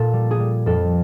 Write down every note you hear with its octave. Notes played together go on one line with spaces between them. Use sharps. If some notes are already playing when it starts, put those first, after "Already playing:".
Already playing: A#2 A4
G3
G#4
G3
F2 A4